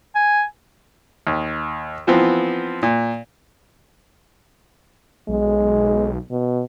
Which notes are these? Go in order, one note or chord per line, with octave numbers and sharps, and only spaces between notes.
G#5
D#2
E3 F3 B3 C4
A#2
B1 G#3
B2